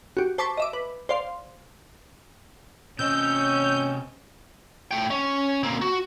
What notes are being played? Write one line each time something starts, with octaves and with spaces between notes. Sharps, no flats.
F#4 G4
C5 A5 C#6 D6 B6
D#5 E5 D6
B4
C5 D5 F5 C6
C3 C#4 C5 D#5 E6 G6
A3 G5
C#4
A#3 C4
F#4